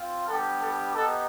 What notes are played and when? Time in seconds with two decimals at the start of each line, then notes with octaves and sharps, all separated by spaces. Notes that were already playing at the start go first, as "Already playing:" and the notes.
Already playing: C4 F4
0.27 G3 B3 D4 G4 A4
0.60 A4
0.94 B3 D#4 G4 A4